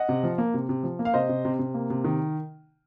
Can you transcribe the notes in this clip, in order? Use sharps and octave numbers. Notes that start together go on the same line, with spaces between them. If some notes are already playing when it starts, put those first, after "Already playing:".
Already playing: D#5 F#5
C3
F3
A#3
C3
C3
F3
A#3
F5
C3 C5 D#5
C3
C3
C3
A#3
C3
D#3